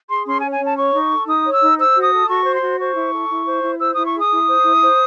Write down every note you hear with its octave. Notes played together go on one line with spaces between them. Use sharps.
G#4 C6
C#4 C6
G#5
C#5
G#5
C#4 A5
C#5 C#6
D#4
A4
D#4 D#6
C#5
E6
D#4
C5 E6
F#4
D#6
A4
F#4 C#6
C5
C6
F#4
C5 C#6
E4
A4
E4
C5
E4
C5 E6
E4 D#6
C#6
G#4 D#6
E4
C5
E4
C5